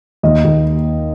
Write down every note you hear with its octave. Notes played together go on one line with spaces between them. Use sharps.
D#2 D#5
D#2